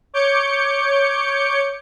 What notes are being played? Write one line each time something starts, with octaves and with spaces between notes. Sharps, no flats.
C#5 D6 G6 C#7